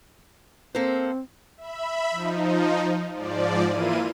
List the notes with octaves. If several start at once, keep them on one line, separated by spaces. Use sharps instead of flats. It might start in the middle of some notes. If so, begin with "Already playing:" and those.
A#3 C4 A4 C5
E5 B5
F3 D#4
G#2 F3 D5
E3 A#3 E4 F4 D#7